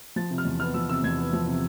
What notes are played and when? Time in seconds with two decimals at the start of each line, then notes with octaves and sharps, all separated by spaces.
0.16 F3 A6
0.30 C3
0.38 F6
0.45 E2
0.60 B3 F6
0.74 F3 E6
0.89 C3 E6
1.03 E2 G#6
1.18 B3
1.33 F3
1.47 C3